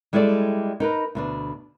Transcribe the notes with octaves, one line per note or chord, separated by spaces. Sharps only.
G3 G#3 E4 A4 A#4 D5
D#4 A#4 B4
D2 B2 D4